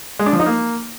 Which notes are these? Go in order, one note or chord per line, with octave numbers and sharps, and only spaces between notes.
G#3
D4
F3
D#4
A#3